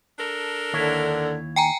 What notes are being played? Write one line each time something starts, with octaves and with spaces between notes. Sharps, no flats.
D4 A4 A#4
D#2 D3 E4 C#5
G5 G#5 A#5